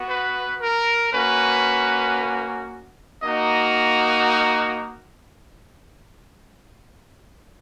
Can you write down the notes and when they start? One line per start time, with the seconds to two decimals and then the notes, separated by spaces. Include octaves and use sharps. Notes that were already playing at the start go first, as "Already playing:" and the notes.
Already playing: B3 F#4
0.09 B4
0.61 A#4
1.13 A#3 C#4 F#4 B4
3.23 A#3 D#4 F#4 D#5